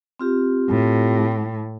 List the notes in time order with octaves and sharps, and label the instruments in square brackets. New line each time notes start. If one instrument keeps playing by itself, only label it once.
[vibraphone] C4 F4 G4
[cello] A2